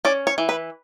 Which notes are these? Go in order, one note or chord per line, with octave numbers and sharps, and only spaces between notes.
C#4 D5
C#5
E3
B4